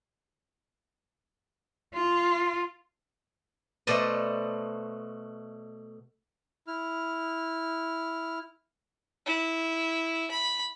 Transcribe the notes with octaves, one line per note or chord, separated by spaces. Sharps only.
F4
B2 A3 B4 C5 D5 D#5
E4 F6
E4
B5